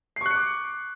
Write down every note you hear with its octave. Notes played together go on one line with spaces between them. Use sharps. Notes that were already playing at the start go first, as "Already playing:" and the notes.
C#6 D6 F#6 C7 C#7